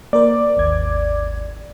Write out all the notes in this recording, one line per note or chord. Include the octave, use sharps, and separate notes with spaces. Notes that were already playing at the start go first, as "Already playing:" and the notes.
A#3 A#4 C5 D5
G#1 D#2 G#6